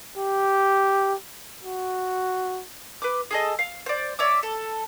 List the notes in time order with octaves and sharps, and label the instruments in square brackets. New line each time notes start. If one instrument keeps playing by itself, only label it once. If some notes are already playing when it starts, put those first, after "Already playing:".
[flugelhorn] G4
F#4
[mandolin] B4 D6
G#4 A4 D#5
F5
C5 D5
C#5 D5 E5 D6
A4